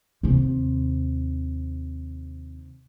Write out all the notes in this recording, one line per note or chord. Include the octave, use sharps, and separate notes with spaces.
D#2 C3